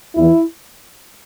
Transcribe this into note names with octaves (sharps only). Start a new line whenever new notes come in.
E2 E3 E4